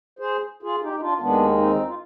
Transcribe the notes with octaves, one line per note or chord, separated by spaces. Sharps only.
G#4 C5
F4 G#4
D#4 G4
D#4
D4 F4
D#2 D#3 G#3 B3 D4
C4 D#4
F4